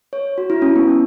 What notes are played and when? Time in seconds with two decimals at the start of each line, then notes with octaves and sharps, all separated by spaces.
0.13 C#5
0.38 F#4
0.50 E4
0.62 C#4
0.76 B3
0.87 C#4